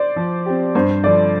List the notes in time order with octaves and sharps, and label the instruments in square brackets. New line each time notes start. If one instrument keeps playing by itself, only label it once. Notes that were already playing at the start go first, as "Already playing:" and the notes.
Already playing: [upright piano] C5 D5
[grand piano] F3
C4 G4
[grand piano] G2 [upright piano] C5
[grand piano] D3 F3 [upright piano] D5